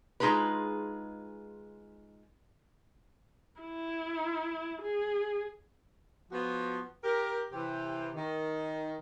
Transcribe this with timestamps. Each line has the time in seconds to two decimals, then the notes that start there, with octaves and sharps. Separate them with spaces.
0.20 G#3 D#4 F4 G#4 B4
3.61 E4
4.81 G#4
6.31 F3 B3 F#4
7.03 G4 A#4
7.52 C3 E3 G4
8.15 D#3